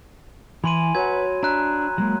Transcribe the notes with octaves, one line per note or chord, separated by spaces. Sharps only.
E3 E4 G#5 B5 C6 D#7
F#3 B4 F#5 G#6
D4 E5 A#5 F#6
F#3 G#3 A#3